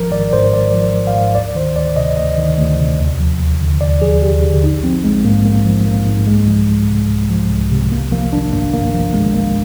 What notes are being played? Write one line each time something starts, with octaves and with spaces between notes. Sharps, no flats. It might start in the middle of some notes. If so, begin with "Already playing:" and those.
Already playing: G#1 F3 A#4
G#1 D5
G#2 C5
G#1 D5
F3
G#1
F5
G#2
D2 D5
D#3 C5
D2 D5
C3 D#5
D2 D#5
D#3
D2
C3
D#2
F3
D#2
D3
D#2 D5
F3 G#4
D#2 G4
D3
A#1 D#4
F3 C4
A#1 G#3
G#2 A#3
A#1 A#3
F3
A#1 A#3
G#2
C2 G#3
F3
C2
C3
C2
F3
C2
C3
G#1 A#3
F3 A#3
G#1 D4
G2 A#3
G#1 A#3
F3 A#3
G#1 G#3
G2 A#3